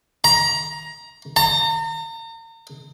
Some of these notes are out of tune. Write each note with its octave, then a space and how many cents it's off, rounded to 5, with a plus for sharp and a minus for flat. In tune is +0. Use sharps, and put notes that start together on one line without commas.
A#5 +20
A#5 -40